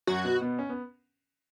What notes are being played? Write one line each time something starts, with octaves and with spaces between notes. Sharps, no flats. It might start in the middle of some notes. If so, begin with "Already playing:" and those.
F#2 F#3 F#4
B2 B3
B2 B3
C#4
B3